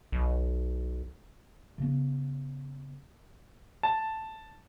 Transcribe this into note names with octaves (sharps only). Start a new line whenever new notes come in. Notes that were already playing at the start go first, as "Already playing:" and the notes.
B1
C#3 B3
A5